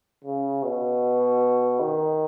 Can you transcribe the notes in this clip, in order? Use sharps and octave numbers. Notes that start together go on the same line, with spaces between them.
C#3
B2
D#3